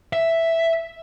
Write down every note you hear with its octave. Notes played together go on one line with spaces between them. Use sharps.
E5